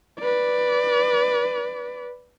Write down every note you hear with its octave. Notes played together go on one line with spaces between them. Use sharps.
B4 D5